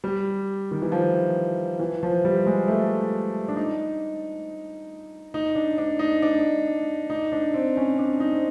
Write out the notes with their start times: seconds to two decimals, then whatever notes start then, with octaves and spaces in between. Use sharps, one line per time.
0.04 G3
0.71 D#3
0.82 E3
0.92 F3
1.79 E3
2.03 F3
2.25 G3
2.46 G#3
2.68 A3
3.48 D4
3.56 D#4
5.34 D#4
5.55 D4
5.78 D4
5.99 D#4
6.22 D4
7.10 D#4
7.32 D4
7.54 C4
7.77 C#4
7.99 D4
8.20 D#4
8.33 C4